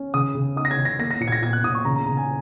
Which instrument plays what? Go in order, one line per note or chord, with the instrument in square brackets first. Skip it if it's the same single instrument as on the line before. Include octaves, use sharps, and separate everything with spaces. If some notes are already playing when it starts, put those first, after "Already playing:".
Already playing: [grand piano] C#4
C#3 D#6
C#3
D#4 D#6
A#6
G#6
C#3
A#6
A#3 A#6
A#6
A#2 C#7
G#6
A#6
A#2 G#6
F#6
A#2 D#6
C#6
C#3 A#5
A#5
C#3 A#5
G#5